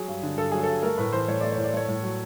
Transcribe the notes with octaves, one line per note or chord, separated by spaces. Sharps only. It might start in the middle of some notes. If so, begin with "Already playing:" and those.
Already playing: F#3 G#4
G2
D3
G2 A4
F#3 G#4
G2 A4
A3 A#4
A2 B4
E3 C5
A2 C#5
A3 D5
C#5
A2
D5
A3 C#5
A2
F#3